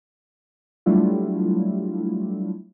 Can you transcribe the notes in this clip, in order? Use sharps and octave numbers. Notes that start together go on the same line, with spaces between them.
F#3 G3 A3 D4 E4 F4